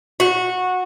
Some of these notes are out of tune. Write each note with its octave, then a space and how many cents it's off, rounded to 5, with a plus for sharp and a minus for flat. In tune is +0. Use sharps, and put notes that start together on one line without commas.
F#4 -15